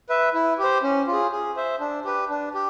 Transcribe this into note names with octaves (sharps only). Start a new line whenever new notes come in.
B4 E5
E4
G4 C5
C#4
F4 G#4
G#4
C5 E5
D4
G4 B4
D4
G4